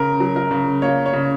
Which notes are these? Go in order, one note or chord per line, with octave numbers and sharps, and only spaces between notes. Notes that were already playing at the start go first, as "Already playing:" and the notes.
Already playing: C#3 A#4
F#3
A#4
C#3
A#3 C#5
C#5
C#3